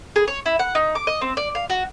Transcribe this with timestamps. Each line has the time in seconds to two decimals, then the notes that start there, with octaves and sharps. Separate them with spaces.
0.16 G#4
0.28 C#5
0.46 E4
0.59 F#5
0.75 D#4
0.95 D6
1.07 D#5
1.21 C4
1.37 D5
1.55 F5
1.70 F#4